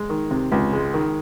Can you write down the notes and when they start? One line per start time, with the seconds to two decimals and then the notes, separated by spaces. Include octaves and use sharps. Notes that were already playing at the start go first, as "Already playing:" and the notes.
Already playing: G#3
0.10 D#3
0.31 C3
0.52 C#2
0.73 G#3
0.94 D#3